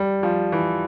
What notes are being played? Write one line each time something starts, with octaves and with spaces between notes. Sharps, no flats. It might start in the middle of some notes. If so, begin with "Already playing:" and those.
Already playing: G3
F3
E3